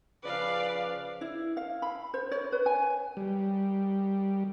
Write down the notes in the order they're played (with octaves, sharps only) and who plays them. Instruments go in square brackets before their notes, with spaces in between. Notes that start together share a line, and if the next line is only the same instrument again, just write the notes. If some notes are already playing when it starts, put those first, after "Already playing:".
[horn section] C#3 F3 B4 [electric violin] D5 F5
[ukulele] E4
F5
B5
C5
C#5
B4
G#5
[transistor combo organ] G3